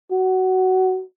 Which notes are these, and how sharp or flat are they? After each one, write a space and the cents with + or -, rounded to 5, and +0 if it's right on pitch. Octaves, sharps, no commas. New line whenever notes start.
F#4 +15